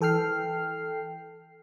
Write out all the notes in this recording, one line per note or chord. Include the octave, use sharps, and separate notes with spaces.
E3 A4 G5 F6 C7